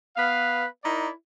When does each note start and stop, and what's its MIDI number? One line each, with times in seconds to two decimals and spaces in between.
0.17 0.66 59
0.17 0.66 71
0.17 0.66 77
0.84 1.10 63
0.84 1.10 64
0.84 1.10 70
0.84 1.10 74